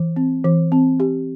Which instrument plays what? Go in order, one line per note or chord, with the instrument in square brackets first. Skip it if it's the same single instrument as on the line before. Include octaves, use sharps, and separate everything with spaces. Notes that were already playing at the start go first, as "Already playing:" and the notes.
Already playing: [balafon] E3
C4
E3
C4
G4